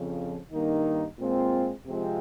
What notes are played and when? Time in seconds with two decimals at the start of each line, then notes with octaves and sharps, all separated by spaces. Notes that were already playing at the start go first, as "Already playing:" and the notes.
Already playing: F2 C#3 F3
0.52 G2 D#3 A#3 D#4
1.18 A#2 G#3 C4 F4
1.86 C3 F3 G#3 C4 F4